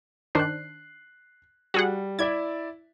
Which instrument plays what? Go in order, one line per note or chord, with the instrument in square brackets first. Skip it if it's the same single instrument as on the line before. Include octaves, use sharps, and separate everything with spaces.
[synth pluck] D#3 D4 C5 [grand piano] F#6 C7
[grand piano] G3 [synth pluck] F#4 G#4 F#5
[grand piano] E4 D5 E5 [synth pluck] G#6